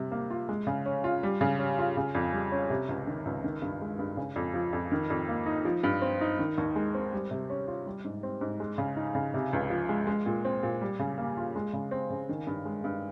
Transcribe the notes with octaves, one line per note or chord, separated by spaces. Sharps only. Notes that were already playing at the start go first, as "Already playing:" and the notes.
Already playing: C3 G3
A#3
F4
G#3
C#3
C#4
F4
G3
C#3
C#4
F4
C#3
F2
G3
C#4
C3
C#2
D#3
C#2
D#3
G2
G#3
G2
C#3
F2
F3
F2
D#3
F2
A#3
D#4
F3
G2
C4
D#4
D#3
D#2
G#3
C4
G3
C3
C#4
F4
G3
G#2
C4
G#2
G#3
C#3
D#4
C#3
C3
C#2
F3
G#3
G#3
A#2
C4
A#2
G3
C#3
A#3
F4
G#3
C#3
C4
C#3
D#3
G2
G#3
G2